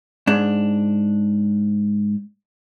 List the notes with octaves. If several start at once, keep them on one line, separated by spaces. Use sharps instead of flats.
G#2 D4